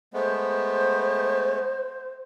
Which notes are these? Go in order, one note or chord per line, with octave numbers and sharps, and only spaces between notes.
G#3 A3 B3 C5